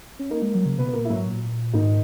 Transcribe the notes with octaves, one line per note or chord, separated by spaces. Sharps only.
C#4
A#3 D#4 A#4
G#3
F#3
C#3
B2 B3 B4
B4
A#2 A#3 A#4
E4
G#2 F#3 F#4
A#2
G#2 D#3 D#4